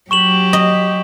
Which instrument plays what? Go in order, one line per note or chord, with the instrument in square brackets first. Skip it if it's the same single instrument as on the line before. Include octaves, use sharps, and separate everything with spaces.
[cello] F#3 G4 [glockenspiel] C#6 E7 F#7
[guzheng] D#5